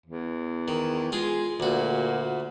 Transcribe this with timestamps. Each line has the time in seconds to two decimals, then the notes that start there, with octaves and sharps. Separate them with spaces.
0.06 E2
0.68 D#3
1.12 G#3 F4 G#4
1.60 D2 A#2 F#4